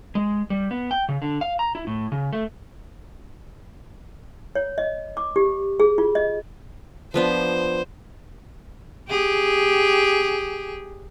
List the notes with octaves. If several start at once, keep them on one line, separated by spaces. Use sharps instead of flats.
G#3
G3
B3
G5
C#3
D3
F5
A#5
E4
A2
C#3
A3
C#5
D#5
D6
G4
G#4
F4
D#5
F3 B3 D4 C5
G4 G#4